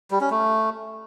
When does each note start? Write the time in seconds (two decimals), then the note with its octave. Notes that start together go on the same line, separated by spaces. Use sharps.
0.11 G3
0.21 C#4
0.30 A3